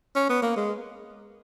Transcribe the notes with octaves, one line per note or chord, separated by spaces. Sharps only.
C#4
B3
A#3
G#3